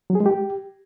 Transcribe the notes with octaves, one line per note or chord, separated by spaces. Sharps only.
F#3
G#4
G#3
G4